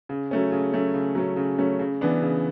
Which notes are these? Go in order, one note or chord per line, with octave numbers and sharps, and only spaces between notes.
C#3
F#3 A3 C#4
C#3
F#3 A3 C#4
C#3
F#3 A3 C#4
C#3
F#3 A3 C#4
C#3
E3 B3 D4
C#3